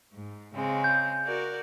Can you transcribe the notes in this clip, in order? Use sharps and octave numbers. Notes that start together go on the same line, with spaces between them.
G#2
C#3 G#3 C4
G6
F#4 A#4 D5